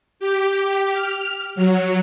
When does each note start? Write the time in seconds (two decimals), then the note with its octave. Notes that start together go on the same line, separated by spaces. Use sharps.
0.19 G4
0.93 F6
1.55 F#3